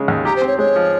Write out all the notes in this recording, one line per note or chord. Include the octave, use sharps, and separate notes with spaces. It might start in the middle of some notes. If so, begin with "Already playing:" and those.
Already playing: C#3 G#3 C#4
D#2
G4 A#5
C5
C4
C#5
G#3 C#5
F3